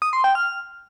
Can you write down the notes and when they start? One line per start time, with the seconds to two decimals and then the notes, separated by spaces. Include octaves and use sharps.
0.02 D#6
0.13 C6
0.24 G5
0.35 F6